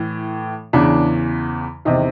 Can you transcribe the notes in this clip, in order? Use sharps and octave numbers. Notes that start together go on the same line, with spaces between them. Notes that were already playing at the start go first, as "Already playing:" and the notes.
Already playing: A2 E3
E2 C#3 E3 D4
E2 C3 D#3 D#4